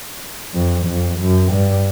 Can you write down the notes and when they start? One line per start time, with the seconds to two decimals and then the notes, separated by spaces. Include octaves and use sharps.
0.54 F2
0.87 F2
1.19 F#2
1.52 G2